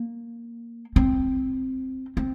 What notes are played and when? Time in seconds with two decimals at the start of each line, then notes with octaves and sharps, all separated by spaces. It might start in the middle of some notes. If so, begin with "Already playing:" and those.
Already playing: A#3
0.96 C4
2.17 C4